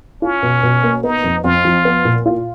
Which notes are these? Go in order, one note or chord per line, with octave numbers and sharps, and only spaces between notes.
C#4 F4
B2
B2
A#3
B3 D#4
F2
F2 F4
F3
B3
A#2
F4